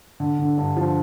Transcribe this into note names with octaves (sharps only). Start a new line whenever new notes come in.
D3
D3
G2
F3